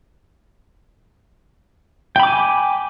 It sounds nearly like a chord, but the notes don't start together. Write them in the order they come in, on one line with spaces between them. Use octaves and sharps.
G5 B5 D6 G#5